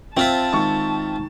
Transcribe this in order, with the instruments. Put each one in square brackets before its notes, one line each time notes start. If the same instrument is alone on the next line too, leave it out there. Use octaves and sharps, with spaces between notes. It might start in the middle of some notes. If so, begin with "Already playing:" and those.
[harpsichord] C4 F4 E5 [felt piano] C5 [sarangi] A5
[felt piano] D#3 G#3 C#6